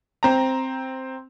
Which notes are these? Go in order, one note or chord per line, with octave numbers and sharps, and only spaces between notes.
C4 A#5